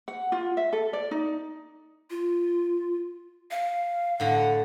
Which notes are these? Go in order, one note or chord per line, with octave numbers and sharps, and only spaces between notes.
F#5
F4
E5
A4
D5
D#4
F4
F5
A2 D3 F#5